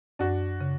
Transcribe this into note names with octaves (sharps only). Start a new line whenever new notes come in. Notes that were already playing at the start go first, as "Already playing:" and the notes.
F#2 D4 F#4
C#3